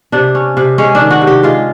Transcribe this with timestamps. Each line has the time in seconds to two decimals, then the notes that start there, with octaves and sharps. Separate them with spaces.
0.12 C3 D4
0.35 C#4
0.57 C3
0.78 G#3 C#4
0.95 D4
1.01 D#3
1.10 F#4
1.22 C3
1.27 G4
1.43 G#3 F4